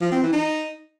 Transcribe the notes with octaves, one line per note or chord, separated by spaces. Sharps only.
F3
C4
E3
D#4